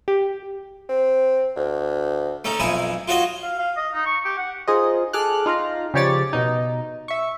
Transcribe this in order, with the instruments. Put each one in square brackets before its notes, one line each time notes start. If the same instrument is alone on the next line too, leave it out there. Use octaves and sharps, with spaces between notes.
[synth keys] G4
[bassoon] C4
D2
[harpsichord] A3 C#4 D#4
B1 F2 E4 G#5 D#6
F4 F#4 C#5 D#5
[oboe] F5
F5
D#5
D#4
C#6
G4
F#5
[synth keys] D#4 F4 G#4 C5 D#5
G#4 A4 D6 F6 F#6
D#4 F4 F5 A#5
C#3 F3 G4 C#5 D5 A6
B2 D#4
E5 C#6